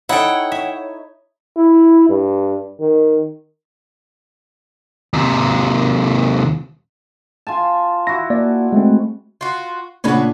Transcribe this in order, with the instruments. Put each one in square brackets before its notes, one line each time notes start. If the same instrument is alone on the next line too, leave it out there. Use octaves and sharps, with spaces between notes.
[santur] D#4 [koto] E4 A4 [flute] C#5 [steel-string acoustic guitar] F#5 G5
[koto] E5
[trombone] E4
G2
D#3
[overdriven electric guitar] D#2 C3
[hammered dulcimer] F4 G#5 A5
[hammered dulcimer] E4 F#4 [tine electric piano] A#6
[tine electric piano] A#3 D5
G#3 A3 C4
[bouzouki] F4 F#4
[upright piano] A#2 D4 F#5 [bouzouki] C#3 B4 C#5